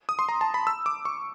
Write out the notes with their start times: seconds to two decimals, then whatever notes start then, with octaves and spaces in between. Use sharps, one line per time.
0.09 D#6
0.19 C6
0.29 A#5
0.41 A5
0.54 B5
0.67 E6
0.86 D6
1.05 C#6